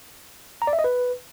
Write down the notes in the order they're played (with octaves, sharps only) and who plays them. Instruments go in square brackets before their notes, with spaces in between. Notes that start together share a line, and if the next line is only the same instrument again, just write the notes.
[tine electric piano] A#5
D5
E5
D#5
B4